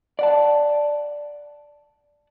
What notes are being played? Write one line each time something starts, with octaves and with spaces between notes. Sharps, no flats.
D5 F#5 A5